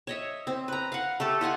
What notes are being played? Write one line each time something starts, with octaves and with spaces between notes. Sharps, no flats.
C#5 D#5 E5
C4
B4 A#5
F5 F#5
A3 G4 A4
F4 D#5 F#5 G#5